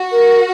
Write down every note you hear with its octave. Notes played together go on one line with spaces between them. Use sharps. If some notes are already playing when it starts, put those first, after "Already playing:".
Already playing: F#4
A#4